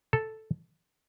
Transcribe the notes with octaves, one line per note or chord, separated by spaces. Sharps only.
A4